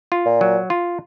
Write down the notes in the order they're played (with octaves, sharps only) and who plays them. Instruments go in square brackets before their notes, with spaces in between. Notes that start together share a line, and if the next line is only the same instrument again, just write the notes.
[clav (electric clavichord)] F4
[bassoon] A#2
[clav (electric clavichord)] F#3
F4